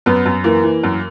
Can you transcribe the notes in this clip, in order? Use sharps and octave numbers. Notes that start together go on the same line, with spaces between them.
F#2 B3
F#2
E3 A#3
E3
F#2